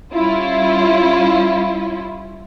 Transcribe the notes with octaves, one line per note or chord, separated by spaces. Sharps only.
G3 C#4 E4 F4